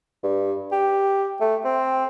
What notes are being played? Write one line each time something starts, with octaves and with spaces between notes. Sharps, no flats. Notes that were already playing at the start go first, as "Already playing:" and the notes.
G2
G4
A3
C4